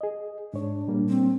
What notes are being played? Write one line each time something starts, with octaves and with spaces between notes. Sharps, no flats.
G#4 D#5
G#2 D4 C#5
A#2 G3 A#3
C4